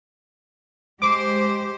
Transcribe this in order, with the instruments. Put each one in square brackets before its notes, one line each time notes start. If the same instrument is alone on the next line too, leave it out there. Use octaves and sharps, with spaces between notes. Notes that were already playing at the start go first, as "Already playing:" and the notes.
[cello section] G#3 G4 C5 [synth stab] D6